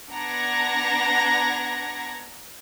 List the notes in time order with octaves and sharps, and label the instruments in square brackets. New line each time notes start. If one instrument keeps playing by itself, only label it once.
[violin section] B3 D4 F#5 A#5 G#6 A#6